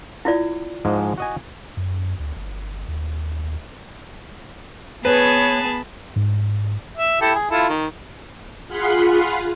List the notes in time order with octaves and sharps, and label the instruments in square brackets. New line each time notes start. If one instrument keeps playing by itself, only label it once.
[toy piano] E4 F4 D5
[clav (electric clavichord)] G#2 F3 G#3
F#4 D#5 G#5
[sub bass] F#2
D2
G1
D#2
[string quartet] B3 B5 [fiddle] G#4 A5 [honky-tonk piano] B4 [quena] C#5
[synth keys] G#2
[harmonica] E5
E4 G4 A4
G#4
E4 F4 A4
D#3
[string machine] F4 G#4 F5 F#5 B5 C6